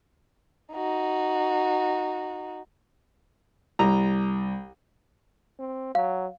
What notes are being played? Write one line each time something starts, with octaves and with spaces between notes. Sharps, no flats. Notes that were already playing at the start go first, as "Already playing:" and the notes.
D#4 F#4
C2 A#5
C4
F#3 F5